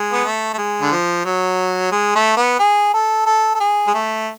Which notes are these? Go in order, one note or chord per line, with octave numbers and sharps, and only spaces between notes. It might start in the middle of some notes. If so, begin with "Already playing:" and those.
Already playing: G#3
B3
A3
A3
G#3
D3
F3
F#3
G#3
A3
B3
G#4
A4
A4
A4
G#4
G#3
A3